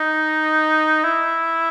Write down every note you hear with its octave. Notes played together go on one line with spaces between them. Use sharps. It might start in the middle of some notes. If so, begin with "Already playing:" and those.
Already playing: D#4
E4